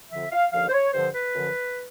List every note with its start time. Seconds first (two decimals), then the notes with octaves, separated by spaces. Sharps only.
0.10 F2 D3 F3 E5
0.32 F5
0.52 D#2 D3 F3 F5
0.69 C5
0.73 C#5
0.93 G2 D3 F3 C5
1.14 B4
1.35 F#2 D3 F3